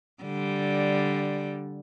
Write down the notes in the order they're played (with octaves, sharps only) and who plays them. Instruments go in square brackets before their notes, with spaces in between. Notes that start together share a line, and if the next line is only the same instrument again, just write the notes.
[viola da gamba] D3 G3